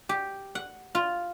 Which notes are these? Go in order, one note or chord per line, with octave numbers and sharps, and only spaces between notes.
G4
F#5
F4